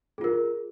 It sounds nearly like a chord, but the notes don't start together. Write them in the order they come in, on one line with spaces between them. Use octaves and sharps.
G#4 F4 A#4